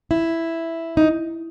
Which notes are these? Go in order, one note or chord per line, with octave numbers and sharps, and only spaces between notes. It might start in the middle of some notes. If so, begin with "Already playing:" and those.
E4
D#4